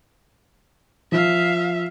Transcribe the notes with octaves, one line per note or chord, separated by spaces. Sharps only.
F3 E5 F5